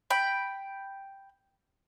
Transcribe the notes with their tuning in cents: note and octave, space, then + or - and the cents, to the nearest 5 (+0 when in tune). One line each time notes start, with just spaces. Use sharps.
G5 +0 B5 +0